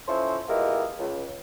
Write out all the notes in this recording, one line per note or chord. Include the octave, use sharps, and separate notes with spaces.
F3 C#4 E4 A4 C5
B2 G#3 E4 F4 G4 A#4
C#2